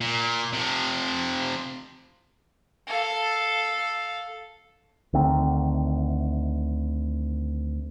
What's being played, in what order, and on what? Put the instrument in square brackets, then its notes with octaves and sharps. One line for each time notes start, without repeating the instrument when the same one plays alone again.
[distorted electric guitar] A#2
C3 F3
[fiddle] A4 F5
[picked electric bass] D2 D3 D#3 C4